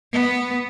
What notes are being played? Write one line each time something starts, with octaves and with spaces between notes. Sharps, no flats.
B3